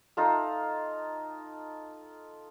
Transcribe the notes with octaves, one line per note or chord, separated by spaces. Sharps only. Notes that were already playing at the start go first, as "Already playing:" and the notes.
D#4 F4 A4